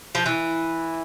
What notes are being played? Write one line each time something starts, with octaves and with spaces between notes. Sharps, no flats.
F3
E3